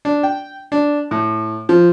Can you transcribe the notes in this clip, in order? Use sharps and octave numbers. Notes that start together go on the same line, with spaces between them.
D4
G5
D4
A2
F3